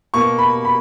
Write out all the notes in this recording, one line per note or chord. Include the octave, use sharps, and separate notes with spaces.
B2 A#3 C#6
B5
B5